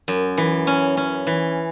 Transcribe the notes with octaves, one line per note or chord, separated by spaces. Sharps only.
F#2
E3
C#4
C#4
E3